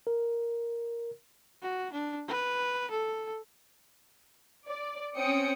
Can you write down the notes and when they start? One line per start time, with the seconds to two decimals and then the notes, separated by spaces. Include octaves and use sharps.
0.07 A#4
1.62 F#4
1.93 D4
2.28 B4
2.91 A4
4.68 D5
5.17 C4 C#4 G5 D#6 C#7